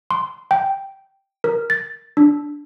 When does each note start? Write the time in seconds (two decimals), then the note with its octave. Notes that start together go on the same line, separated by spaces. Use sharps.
0.11 C6
0.51 G5
1.44 A#4
1.70 A6
2.17 D4